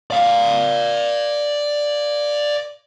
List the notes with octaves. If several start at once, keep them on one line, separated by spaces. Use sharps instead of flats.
D5 F5